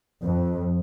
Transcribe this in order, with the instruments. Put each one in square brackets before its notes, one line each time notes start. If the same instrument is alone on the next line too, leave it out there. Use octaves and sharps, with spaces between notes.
[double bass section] F2